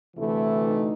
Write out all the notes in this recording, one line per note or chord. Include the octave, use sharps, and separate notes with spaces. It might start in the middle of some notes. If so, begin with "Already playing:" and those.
D2 C3 E3 A3 E4
D#4